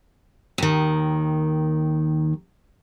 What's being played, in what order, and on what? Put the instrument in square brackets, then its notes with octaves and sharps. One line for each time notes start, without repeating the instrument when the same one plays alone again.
[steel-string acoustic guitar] D#2 D#3